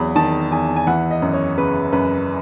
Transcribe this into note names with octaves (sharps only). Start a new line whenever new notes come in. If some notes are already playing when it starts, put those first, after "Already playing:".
Already playing: E2 F#3 B5
D#3 A5
E2 G#5
G#5
E3 F#5
D#5
F#2
C#5
C#3 B4
F#2 B4